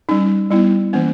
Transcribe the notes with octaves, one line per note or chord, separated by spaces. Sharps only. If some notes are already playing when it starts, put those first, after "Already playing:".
G3 C#4 D#4
G3 B3 E4
E3 A#3 C#4